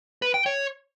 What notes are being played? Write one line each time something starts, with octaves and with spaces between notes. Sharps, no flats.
B4
G5
C#5